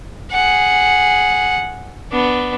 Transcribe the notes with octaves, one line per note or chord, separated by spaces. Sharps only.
G#4 F#5
B3 D4